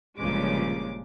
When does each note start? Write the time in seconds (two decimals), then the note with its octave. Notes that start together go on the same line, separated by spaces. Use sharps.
0.18 G1 A#2 C#3 F3 G#3 D6